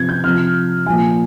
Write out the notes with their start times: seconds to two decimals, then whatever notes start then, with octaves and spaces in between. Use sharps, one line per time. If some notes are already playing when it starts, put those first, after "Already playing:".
Already playing: C3 F3 G#6
0.09 G6
0.24 C3 F3 F6
0.86 A#2 F3 G#5